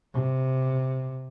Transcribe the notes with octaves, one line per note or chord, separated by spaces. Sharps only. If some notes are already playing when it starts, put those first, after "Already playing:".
C3